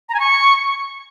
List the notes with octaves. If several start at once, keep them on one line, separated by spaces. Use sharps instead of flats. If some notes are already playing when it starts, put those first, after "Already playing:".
A#5
G#5
C#6